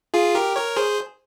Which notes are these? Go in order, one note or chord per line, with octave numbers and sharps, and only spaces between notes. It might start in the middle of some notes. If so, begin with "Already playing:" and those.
F4 G#4
G4 A#4
A#4 C#5
G#4 C5